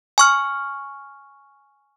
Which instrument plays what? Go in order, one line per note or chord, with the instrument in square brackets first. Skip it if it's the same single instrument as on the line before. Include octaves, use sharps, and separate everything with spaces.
[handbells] G#5 C#6 F6